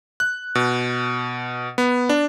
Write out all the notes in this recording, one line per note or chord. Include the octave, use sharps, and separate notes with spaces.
F#6
B2
B3
D4